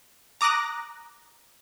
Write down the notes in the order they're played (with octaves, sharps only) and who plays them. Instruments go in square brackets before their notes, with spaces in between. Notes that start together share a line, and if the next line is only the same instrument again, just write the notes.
[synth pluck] A#5 D6 D#6 F#6 A#6